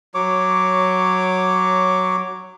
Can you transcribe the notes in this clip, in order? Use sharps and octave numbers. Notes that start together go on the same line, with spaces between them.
F#3 C#5 D6